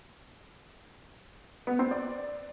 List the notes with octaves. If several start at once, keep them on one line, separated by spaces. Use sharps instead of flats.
B3
C4
D5